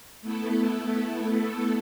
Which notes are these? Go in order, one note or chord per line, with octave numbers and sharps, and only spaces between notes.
A3 B3 E4 A4